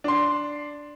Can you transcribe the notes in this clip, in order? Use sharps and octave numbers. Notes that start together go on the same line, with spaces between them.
D4 C6